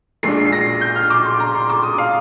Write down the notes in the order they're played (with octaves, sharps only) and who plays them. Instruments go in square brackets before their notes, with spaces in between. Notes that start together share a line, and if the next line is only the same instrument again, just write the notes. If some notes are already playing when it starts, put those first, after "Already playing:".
[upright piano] A#1 A#2 G#3 D4 C7
C7
A#6
G6
F6
D6
C6
A#5
C6
D6
D#6
F5